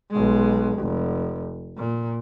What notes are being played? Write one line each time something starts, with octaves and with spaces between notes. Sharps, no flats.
B1 G#3
F1
A#2